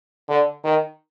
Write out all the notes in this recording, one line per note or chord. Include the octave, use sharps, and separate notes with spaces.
D3
D#3